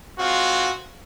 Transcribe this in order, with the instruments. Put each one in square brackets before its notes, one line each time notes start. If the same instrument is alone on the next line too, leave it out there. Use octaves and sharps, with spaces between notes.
[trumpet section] G#3 C4 F4 F#4